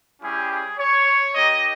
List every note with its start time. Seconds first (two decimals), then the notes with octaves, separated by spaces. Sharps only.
0.22 G3 C#4 E4 G4 G#4
0.49 G#4
0.78 C#5
1.34 A#3 D#4 G4 D#5